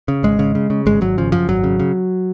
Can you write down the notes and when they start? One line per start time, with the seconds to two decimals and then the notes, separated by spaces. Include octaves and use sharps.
0.08 C#3
0.23 G#1 G#3
0.39 C#3
0.55 C#3
0.70 C#3
0.86 G#1 G#3
1.01 G#1 F#3
1.18 C#3 F3
1.32 F#2 F3
1.48 G#1 F#3
1.64 C#3
1.79 C#3